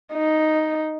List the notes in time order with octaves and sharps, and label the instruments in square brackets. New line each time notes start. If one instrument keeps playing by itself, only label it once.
[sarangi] D#4